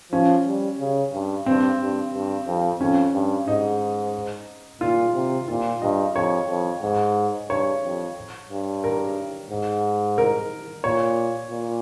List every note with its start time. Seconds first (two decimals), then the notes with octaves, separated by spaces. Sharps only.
0.12 F3 C#4
0.46 G3
0.80 C#3
1.13 G2
1.46 G2 C4
1.80 G2
2.13 G2
2.47 F2
2.80 F2 C#4
3.14 G2
3.47 G#2 D#4
4.81 A#2 F4
5.15 C3
5.48 A#2 F4
5.82 G2 D#5
6.15 F2 C#5
6.49 F2
6.83 G#2
7.49 G2 C#5
7.83 F2
8.50 G2
8.84 A#4
9.50 G#2
10.18 A#4
10.84 A#2 C#5
11.51 A#2